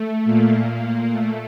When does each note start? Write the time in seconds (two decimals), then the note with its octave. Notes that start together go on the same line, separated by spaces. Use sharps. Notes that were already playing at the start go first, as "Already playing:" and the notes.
Already playing: A3
0.25 A#2 A#3
1.11 A3